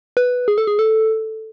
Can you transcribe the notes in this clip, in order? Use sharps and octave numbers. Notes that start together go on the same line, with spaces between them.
B4
G#4
A4
G#4
A4